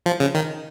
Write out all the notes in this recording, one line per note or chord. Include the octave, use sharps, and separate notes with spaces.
F3
C#3
D#3